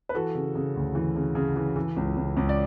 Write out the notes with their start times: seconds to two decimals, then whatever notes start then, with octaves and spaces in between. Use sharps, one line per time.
0.09 B4
0.14 E3 F#4 A4
0.35 C#3
0.55 C#3
0.76 D2
0.95 E3
1.16 C#3
1.35 C#3
1.56 E3
1.76 E3
1.96 C#2
2.17 C#2
2.37 C#2
2.49 D5